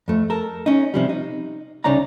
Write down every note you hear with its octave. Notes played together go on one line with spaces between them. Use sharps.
F2 A3
A4 A#4
C#4 D#4
C3 F3 G3
D#4
C2 C#3 D#4 C#5 D5 A#5